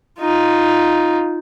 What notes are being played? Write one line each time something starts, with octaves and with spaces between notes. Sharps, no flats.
D#4 F4